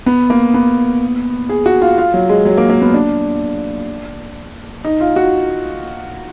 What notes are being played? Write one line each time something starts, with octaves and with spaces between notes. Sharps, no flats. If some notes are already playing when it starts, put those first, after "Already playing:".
B3
A#3
B3
G#4
F#4
F4
F4
F#3
G#3
F#3
A#3
A#3
B3
D4
D#4
F4
F#4